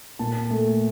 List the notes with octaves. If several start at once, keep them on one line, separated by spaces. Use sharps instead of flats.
A#2 A5
A3